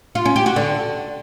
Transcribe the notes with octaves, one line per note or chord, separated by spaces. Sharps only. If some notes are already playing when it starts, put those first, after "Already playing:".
F4
C#4
G4
F#4
D3